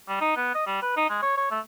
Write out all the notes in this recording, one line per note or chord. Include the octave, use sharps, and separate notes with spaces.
G3
D#4
B3
D#5
G3
B4
D#4
G#3
C#5
C#5
A3